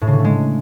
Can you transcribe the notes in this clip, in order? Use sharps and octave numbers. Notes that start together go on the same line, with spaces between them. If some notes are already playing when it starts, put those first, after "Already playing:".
A2
C#3
D3
A3
G#3